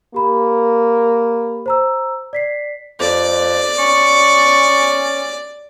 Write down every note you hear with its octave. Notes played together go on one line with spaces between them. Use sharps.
A#3 G4 B5
C5 A#5 E6
D5 B6 C7
F2 D5
C#4 C#6